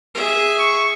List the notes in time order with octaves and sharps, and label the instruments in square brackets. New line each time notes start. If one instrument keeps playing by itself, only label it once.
[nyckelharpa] G#4 E5
[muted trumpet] C#6